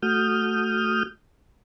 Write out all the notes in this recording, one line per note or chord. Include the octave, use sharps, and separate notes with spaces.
A3 F#4 D#6 F6 G6